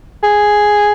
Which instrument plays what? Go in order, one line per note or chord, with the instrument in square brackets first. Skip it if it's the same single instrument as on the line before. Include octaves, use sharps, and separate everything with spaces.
[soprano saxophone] G#4